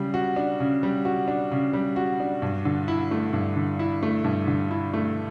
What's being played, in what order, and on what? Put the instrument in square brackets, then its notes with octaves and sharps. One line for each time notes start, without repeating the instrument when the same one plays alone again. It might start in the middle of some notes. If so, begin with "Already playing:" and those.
Already playing: [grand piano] C#3 G3
F#4
D4
C#3
G3
F#4
D4
C#3
G3
F#4
D4
G2
D3
E4
A3
G2
D3
E4
A3
G2
D3
E4
A3